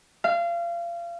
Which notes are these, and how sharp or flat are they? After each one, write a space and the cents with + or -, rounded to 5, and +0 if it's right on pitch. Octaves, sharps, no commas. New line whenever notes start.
F5 -30